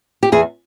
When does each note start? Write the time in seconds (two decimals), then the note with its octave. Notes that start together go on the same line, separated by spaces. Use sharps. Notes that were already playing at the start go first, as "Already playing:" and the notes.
0.23 G4
0.32 E2 G#4